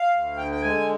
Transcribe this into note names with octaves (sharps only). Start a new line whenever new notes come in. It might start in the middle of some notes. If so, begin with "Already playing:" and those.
Already playing: F5
D2
D3 G5
G5
G#3 G#5